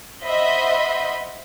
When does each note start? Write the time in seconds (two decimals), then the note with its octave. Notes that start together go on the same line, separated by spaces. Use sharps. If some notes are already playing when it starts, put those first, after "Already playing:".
0.23 C5 D#5 E5 F#5 B5 C6